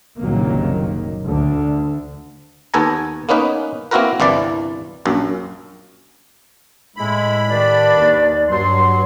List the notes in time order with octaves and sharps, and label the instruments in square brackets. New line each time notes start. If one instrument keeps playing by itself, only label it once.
[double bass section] F#1 C2 A#2 D#3 F#3 A#3
D2 D3
[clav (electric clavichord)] D#2 B3 A4 G#5 A#5
A#3 B3 C#4 D#4 B4
A#3 C4 E4 F#4 A#4 B4
G1 C2 E3 D5
A#1 F#2
[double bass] A2 [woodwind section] G#3 E4 [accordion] B5
[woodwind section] G2 D#3 D4 [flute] D5
[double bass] D#2
[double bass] G2 [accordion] F#3 [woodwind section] C6